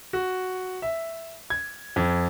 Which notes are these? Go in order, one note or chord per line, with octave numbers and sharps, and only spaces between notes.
F#4
E5
G#6
F2